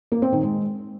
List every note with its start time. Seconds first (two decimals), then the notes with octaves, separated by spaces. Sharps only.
0.12 A#3
0.22 C4
0.32 D#3
0.43 G#3